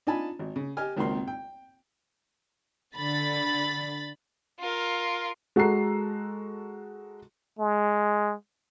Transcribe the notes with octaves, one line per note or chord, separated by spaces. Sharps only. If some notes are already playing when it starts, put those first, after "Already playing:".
D4 D#4 F4 G#5 A5 B5
G#1
C#3
G4 D#5 G#5 F6
G#1 C#2 D#3 A#3 C4 C6
G5
D3 B5 A6
F4 A#4
G#3 F#4 A4 A#5 C7
G#3